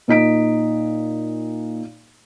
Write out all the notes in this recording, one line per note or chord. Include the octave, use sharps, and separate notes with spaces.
A#2 D#4 B6 D7